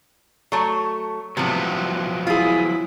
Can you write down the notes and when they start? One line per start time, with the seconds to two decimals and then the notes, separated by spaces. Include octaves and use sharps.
0.52 F#3 A3
1.37 A2 C3 F3 F#3 B3
2.27 E4 F4 G#4